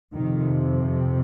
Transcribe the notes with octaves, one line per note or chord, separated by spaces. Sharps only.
F2 C3 D#3